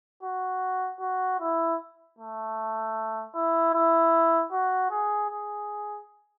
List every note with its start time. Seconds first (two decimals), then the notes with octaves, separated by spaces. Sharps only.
0.23 F#4
1.00 F#4
1.40 E4
2.18 A3
3.34 E4
3.74 E4
4.52 F#4
4.91 G#4
5.30 G#4